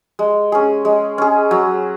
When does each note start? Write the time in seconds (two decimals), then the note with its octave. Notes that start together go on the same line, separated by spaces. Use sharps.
0.19 G#3
0.52 C#4 G#4
0.85 G#3
1.18 C#4 G#4
1.51 F#3